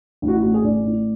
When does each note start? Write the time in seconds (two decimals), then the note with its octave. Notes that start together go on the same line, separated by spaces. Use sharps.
0.22 A1
0.28 F#4
0.34 E4
0.43 A2 F#4
0.54 G#4
0.64 A1 D5
0.85 A2